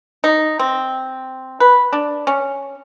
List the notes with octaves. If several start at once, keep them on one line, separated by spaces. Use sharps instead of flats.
D#4
C4
B4
D4
C#4